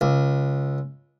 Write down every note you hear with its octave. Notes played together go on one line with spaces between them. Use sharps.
C#2